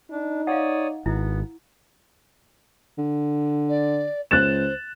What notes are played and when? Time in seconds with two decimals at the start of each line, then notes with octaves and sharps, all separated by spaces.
0.11 D4 D#4
0.47 C#5 D5 F5 F#5 D#6
1.06 G#1 B3 E4
2.98 D3
3.69 D5
4.31 C#2 C5 F#6 A6 E7